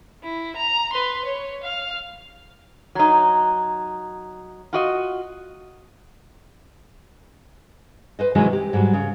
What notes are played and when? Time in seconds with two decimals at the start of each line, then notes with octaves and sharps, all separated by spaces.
0.23 E4
0.56 A#5
0.93 B4 C6
1.25 C#5
1.63 F5
2.95 F#3 D#4
4.73 F4 F#4 D#5
8.19 B4 C5 D#5
8.35 C3 D#3 E3 F#3 G#3 C#4
8.53 G4
8.73 G#2 F#3 G3
8.93 C#3